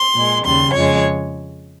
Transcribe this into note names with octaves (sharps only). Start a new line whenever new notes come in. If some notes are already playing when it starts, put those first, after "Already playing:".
Already playing: C6
A#2 G#3
D#2 C#3 G3 C6
F2 C#3 F3 G#3 C#5